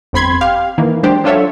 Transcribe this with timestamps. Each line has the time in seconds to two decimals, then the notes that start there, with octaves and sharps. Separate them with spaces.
0.13 G1 F2 C4 B5 C6 G#6
0.41 G4 F5
0.78 D#3 E3 A#3
1.03 F#3 G#3 D4 G4 C5
1.24 F#3 D4 F4 A4 C#5 E5